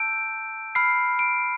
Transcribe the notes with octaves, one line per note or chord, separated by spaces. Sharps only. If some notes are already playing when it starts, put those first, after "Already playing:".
Already playing: A5 E6 G6 D7
B5 F6 C7
D7